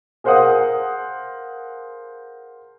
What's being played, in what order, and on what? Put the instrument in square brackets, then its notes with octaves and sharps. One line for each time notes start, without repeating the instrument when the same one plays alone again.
[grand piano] G#4 A#4 C5 F5 F#5 D#6